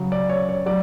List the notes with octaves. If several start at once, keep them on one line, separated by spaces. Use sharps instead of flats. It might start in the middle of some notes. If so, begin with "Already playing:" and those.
Already playing: C#3 F#3
D5
C#5
C#5
F#3 D5